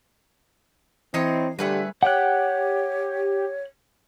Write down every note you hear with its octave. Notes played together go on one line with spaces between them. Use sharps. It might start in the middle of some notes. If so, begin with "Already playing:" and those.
E3 C4 D#4 E4 C#5 D#5 C7
D3 G3 A3 G4 G#4 B4
G4 C#5 F#5 F#6